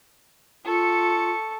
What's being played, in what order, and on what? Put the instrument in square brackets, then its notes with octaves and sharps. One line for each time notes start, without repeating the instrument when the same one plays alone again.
[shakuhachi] F4 [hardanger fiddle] A4 C#6